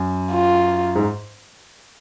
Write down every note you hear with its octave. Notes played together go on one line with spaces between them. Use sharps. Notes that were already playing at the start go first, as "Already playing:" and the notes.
Already playing: F#2
F4
G#2